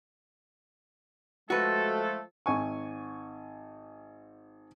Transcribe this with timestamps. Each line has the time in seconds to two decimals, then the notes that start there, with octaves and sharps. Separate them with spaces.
1.50 F3 G#3 A3 F#4 A4 B4
2.46 G#1 G#5 C#6